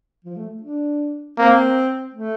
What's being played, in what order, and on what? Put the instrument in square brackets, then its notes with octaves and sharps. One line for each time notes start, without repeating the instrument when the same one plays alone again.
[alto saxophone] F3
A3
D4
[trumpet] A#3 [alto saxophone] C4
[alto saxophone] A3